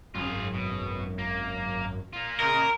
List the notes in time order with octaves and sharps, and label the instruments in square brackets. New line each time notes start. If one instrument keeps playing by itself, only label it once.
[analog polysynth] G#1 F#2 [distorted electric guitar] F4 G#4
[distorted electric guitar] B2
A#3
A#3 F4
[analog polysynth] C#3 D#5 [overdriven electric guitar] A#4